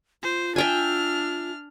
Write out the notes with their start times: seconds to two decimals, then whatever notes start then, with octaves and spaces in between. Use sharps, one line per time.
0.23 F4 C5
0.56 D4 E5 G5 G#5 F6